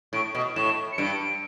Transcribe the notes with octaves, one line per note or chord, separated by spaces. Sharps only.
A2 D7
B2
A2 E7
C#7
G2 D7